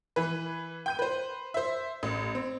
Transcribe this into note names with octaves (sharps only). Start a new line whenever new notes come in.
E3 B4
G5 G6 D#7
B4 C5
C5 E5
A1
C4